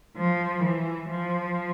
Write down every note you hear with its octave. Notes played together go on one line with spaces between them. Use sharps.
F3
E3
F3